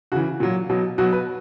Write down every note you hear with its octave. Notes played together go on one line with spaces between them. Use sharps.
C#3 E3 F#4
A#2 F#3
B2 F#3
B2 F#3 F#4
B4